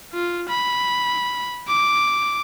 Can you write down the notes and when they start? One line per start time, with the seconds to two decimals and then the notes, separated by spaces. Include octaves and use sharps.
0.13 F4
0.49 B5
1.68 D6